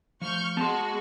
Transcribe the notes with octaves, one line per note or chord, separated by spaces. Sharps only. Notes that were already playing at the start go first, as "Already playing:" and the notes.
F3 A3 C#6 F6 G6
G#3 B3 F#4 A5 C6